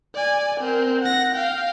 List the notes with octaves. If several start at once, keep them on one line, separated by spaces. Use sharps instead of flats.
D5 G#5
C4 A#4
F#5 A#6
F5 G5